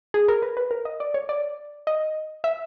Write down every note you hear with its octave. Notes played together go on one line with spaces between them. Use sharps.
G#4
A#4
B4
B4
A#4
D#5
D5
C#5
D5
D#5
E5